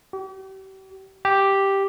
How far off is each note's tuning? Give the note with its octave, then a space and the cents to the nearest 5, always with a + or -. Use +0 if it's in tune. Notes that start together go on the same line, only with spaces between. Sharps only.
G4 -40
G4 +0